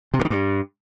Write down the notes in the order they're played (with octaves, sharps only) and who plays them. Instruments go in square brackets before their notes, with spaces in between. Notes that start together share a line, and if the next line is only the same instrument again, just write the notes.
[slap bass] C3
G2
D#3
G2